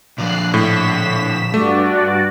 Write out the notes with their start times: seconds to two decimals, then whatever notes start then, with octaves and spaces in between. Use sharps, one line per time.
0.18 A#2 D3 F3 F#6 C7
0.54 A2 B6 E7
1.54 G2 A3 F#4 D5